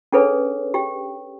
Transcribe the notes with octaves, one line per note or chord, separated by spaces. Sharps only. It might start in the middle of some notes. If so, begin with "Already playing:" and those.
C#4 D4 G#4 A4 B4 C#5
G4 G5